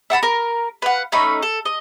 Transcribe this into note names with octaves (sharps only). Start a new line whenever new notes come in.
E5 F#5 A5 B5
A#4
B4 F5 F#5
A3 C#4 D#4 B5
A4
D#5